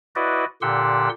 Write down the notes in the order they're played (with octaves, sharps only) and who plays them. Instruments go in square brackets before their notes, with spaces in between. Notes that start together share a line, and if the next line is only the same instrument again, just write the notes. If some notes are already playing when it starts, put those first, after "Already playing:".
[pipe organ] E4 F#4 B4 D5 D#5
A#2 D3 G4 F#5 C6 E6